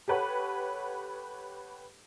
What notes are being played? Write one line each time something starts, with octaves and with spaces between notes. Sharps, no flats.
G4 A4 B4 C#5 F#5